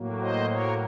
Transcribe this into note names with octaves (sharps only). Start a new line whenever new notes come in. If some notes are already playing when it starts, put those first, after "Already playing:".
Already playing: A2 F#3 A#3
C5 D#5
A#4 C#5